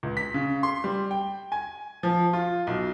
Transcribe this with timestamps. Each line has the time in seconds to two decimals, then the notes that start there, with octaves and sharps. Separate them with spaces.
0.03 C#2
0.17 B6
0.34 C#3
0.63 C6
0.84 G3
1.11 G5
1.52 G#5
2.03 F3
2.33 F4
2.67 B1